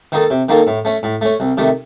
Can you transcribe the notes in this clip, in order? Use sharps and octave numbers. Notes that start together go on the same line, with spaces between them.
D#3 A#3 D#4 A4
C3
D#3 A#3 D#4 A4
A2
A3 C#4
A2
A3 C#4
C2
C3 D#3 A3